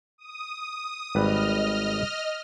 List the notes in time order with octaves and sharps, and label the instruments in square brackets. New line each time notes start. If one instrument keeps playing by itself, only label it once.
[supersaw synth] D#6
[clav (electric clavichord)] G#1 G3 B4 [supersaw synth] D#5 F6